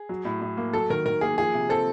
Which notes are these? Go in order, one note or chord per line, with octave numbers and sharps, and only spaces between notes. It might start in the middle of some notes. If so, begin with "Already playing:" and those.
Already playing: G#4
F#3
A2
A2
A#3
F#3 A4
D#3 A#4
D#3 A#4
A#3 G#4
F3 G#4
C3
C4 A4